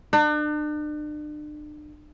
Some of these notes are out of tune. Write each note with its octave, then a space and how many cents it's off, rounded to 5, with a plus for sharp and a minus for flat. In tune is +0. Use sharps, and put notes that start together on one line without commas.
D4 +40